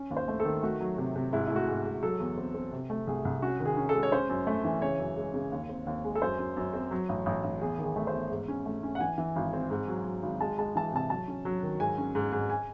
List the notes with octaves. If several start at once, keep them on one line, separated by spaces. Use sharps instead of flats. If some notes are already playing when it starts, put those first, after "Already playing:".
Already playing: C#4
D#2
C5
A3
A4
D#3
A3 F#4
F#3
C3
C3
G#2 E4
A3 E4
F#4
G#2
G#2
F#3 A4
E2
C4
C4
C3
A3
C2 G#4
C2
C#4 F#4
D#3
G#4
C#4
A4
G#3
C#5
C#4 C5
F#2
A3
E3
C#3 C#5
F#2
G#3
C#3
D#2
C4
D#2
G#3
A4
F#2 C5
F#2
F#2
C4
F#3
A1
A1
A1
E2 G#4
D#3
G#4
A3
C5
E2
G#2
C#4
A3
C#4
F#5
E3 G#5
E3
G#1
C4
G#2
F#3
F#3
G#1
G#3 A5
G#3 A5
E3 A5
C3 A5
F#3 A5
C#4
F#3
D#3
G#2 G#5
C#4
G#2
G#2
G#5